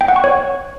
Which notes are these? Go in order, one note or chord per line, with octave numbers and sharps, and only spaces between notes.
G5
F#5
C#6
C#5